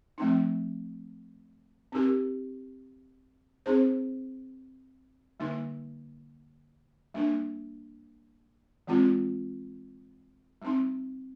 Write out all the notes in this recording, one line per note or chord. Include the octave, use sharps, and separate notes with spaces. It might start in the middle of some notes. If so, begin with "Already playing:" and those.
F3 A3 C4 D#4
C4 D#4 G4 A#4
C4 D#4 G#4 C5
D3 G3 A#3 D#4
G3 A#3 D4
E3 G#3 C4 F4
G3 C4 D#4